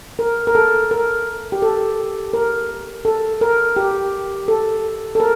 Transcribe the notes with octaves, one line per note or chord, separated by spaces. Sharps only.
A#4
A#4
A4
A#4
G4
A4
A#4
A4
A#4
G4
A4
A4
A#4